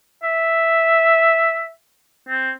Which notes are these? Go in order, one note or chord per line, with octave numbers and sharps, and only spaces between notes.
E5
C4